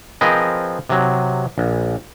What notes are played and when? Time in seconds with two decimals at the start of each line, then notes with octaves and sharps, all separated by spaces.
0.21 F3 C4 G#4 A#4 B4 D#5
0.89 C3 F#3
1.58 A#1